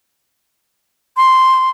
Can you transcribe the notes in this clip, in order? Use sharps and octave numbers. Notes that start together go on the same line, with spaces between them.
C6